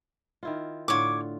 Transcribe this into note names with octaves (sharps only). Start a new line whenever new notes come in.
D#3 E4 F4
A2 D3 F4 C#5 D6